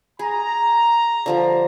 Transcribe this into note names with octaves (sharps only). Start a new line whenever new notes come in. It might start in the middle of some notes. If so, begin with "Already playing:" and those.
G#4 A#5
D3 F3 G3